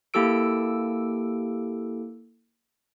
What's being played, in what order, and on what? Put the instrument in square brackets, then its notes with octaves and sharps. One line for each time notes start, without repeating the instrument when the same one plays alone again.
[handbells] A#3 E4 G4 A4 E6 D7